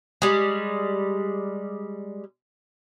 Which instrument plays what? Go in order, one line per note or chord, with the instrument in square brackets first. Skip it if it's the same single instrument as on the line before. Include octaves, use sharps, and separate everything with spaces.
[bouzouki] G3 G#3